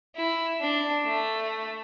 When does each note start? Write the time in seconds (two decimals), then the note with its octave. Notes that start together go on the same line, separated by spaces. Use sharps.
0.15 E4
0.60 D4
1.05 A3